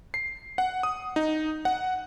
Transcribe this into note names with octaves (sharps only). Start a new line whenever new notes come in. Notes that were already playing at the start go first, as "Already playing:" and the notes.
C7
F#5
D#6
D#4
F#5